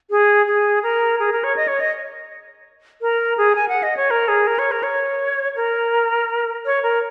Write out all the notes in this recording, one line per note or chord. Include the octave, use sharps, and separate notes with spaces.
G#4
G#4
A#4
G#4
A#4
C#5
D#5
C#5
D#5
A#4
G#4
G#5
F#5
D#5
C#5
A#4
G#4
A#4
C#5
A#4
C#5
A#4
C#5
A#4